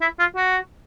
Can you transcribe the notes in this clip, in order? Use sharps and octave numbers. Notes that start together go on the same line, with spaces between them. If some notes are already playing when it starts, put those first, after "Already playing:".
E4
F4
F#4